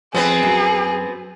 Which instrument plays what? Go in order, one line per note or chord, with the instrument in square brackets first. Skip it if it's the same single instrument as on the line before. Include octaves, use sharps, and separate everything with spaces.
[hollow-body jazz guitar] F2 [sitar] B3 C4 B4 [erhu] G#4
[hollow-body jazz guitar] F#2